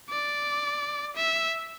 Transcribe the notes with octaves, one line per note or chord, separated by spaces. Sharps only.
D5
E5